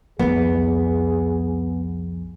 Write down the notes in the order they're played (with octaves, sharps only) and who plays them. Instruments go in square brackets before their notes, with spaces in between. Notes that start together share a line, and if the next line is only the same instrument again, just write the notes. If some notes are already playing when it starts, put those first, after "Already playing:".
[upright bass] C2 F2 [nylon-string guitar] B3 [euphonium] G#4